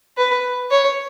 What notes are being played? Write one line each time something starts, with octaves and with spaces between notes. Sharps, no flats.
B4
C#5